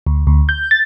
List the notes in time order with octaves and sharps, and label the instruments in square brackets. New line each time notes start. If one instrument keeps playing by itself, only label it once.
[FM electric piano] D2
D2
G6
A6